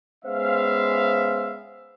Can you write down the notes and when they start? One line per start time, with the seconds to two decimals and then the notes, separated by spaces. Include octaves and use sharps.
0.25 G#3 B3 C#4 C5 E5 F5